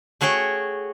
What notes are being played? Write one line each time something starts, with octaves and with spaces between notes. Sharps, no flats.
A3 F#4 G#4 C#5 G5